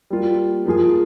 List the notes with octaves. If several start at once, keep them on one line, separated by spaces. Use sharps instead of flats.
G3 A#3 F4
F3 A#3 F4 G#4